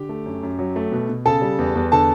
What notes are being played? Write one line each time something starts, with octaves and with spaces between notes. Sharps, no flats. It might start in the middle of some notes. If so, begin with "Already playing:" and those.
Already playing: D3 G4
A3
F#2
F#2
F#3
A3
B2
B2
C#3 A4 A5
G3
E2
E2
D3 A4 A5